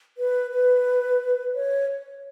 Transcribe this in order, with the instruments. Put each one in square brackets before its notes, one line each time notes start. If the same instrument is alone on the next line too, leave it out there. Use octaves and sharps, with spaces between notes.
[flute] B4
B4
C#5